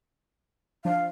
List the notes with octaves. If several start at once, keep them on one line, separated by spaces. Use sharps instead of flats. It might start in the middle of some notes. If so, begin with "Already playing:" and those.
F3 D4 F5